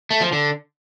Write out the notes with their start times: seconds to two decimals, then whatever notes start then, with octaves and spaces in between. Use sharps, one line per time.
0.11 A3
0.22 F3
0.32 D3